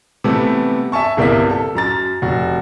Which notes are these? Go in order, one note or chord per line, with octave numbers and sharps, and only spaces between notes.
C3 E3 G3 A3 B3
E5 G#5 A5 C#6
G1 C2 A#3 E4 D5 B6
A4
F#2 A#5 A6
F1 F#4